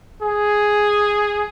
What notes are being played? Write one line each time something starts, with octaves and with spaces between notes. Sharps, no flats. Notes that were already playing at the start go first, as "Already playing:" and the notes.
G#4